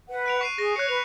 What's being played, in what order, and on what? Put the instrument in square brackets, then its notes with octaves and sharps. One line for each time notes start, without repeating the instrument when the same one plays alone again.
[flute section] B4 F#5
[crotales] F#6 D7 F7
C#6 C7 D#7
[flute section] G#4 C#6 [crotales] A#6
[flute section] C#5 [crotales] F#6 C7 C#7
[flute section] B4 [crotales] F7